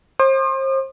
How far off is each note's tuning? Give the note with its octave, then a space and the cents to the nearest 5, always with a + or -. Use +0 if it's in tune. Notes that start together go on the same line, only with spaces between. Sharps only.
C5 +35 D#6 -45